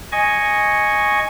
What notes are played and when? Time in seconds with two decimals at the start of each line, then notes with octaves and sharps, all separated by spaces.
0.12 D#5 G#5 C#6